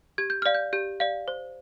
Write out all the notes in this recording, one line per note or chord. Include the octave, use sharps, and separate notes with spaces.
G4 G#6
G6
D5 F5 F6
G6
G4 G6
D5 F5
C5